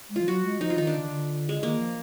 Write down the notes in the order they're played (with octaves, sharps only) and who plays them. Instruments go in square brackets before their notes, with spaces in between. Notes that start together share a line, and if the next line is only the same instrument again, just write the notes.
[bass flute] G#3
[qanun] F4
[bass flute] F3
[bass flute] F#3 [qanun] F#4
[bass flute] G#3
[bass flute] F3 [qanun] D#4
[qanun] F4
[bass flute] D#3 [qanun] D#4
[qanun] D4
[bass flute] D3
D#3
D3
[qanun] G#3
[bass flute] D#3 [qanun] A#3
[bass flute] F3